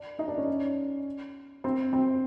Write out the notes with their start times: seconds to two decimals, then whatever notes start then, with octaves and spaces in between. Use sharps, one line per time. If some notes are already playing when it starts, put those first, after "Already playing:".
Already playing: D4
0.19 D#4 D#5
0.28 D4 D5
0.37 C#4 C#5
1.64 C4 C5
1.93 C4 C5